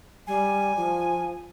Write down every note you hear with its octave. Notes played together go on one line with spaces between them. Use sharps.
G3 G#5
F3